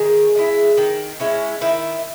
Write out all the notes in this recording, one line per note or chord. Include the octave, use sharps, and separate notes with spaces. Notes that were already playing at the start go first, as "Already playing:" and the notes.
Already playing: D#3 G#4
G#3 C#4 E4
D#3
G#3 C#4 E4
D#3 E4